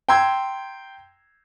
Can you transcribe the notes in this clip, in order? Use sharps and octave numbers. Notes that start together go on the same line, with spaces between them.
G5 A#5 C6 E6 G#6